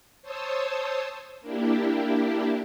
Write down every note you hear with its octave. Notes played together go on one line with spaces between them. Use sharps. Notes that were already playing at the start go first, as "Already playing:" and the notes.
C5 C#5 A5 D#6 E6
A#3 D4 E4 G4